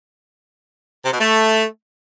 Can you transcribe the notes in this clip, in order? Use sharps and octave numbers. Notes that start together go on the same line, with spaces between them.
C3
B2
A3